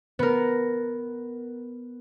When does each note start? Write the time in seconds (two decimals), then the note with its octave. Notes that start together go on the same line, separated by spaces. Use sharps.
0.19 B3 A#4